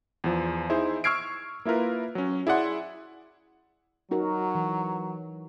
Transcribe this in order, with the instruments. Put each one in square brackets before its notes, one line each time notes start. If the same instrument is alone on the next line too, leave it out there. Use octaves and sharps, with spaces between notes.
[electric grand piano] E2 F3
D#4 E4 G#4 C5
C#6 E6 F6 G#6 C7 D7
A#3 E4 F4 A#4 B4
F#3 C#4
E4 G#4 D5 F#5 C6
[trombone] F#3 [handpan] D#4 F#4 A#4
[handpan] E3